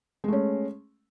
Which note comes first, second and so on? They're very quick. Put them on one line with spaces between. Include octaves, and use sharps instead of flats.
G#3 A3 C#4